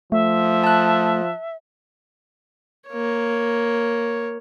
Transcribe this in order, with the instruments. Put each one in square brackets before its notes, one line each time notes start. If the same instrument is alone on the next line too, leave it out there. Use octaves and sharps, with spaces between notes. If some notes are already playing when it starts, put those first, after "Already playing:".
[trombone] F3 [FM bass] A3 [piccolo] E5
[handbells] A5 F#6
[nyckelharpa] A#3 C#5